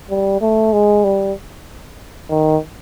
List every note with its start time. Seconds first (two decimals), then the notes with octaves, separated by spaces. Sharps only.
0.10 G3
0.41 A3
0.73 G#3
1.04 G3
2.30 D#3